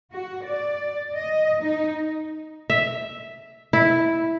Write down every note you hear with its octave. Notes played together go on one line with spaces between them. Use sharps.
F#4
D5
D#5
D#4
E5
E4